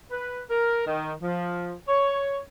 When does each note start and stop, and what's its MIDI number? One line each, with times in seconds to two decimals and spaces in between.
0.10 0.42 71
0.50 0.85 70
0.86 1.12 51
1.22 1.74 53
1.88 2.38 73